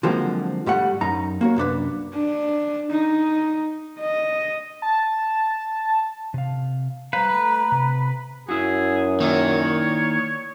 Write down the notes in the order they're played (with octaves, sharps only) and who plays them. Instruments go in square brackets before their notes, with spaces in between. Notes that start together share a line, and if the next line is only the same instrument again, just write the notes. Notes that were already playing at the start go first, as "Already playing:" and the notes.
[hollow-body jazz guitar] D3 F3 F#3 G#3 A#3 C4
G#2 G3 A3 F#5
F#2 D#4 A#5
A#3 F#4 C#5
C2 F#2 D4 B4
[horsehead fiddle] D4
D#4
D#5
[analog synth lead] A5
[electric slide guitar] C3 F5
[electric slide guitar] G3 C5 F5 [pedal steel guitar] B4 [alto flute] A#5
[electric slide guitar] A3
C3
[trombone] F#2 [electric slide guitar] E4 F#4 [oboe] G#4
[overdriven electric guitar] D#3 [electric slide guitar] A#3 E4 D5 [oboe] C#5